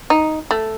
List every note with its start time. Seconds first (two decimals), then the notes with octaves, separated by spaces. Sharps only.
0.10 D#4
0.51 A3